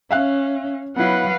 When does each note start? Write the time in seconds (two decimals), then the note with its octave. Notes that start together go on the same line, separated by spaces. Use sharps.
0.11 C#4 E5 F5 F#6
0.96 F#3 B3 E4 B4 F5 F#5